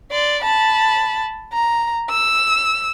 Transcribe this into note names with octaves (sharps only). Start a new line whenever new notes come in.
D5 C6
A5 B5
A#5
E6